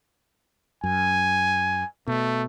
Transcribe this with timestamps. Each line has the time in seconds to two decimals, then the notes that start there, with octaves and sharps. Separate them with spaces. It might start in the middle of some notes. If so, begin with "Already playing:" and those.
0.84 F#2 G#5
2.07 B2 A3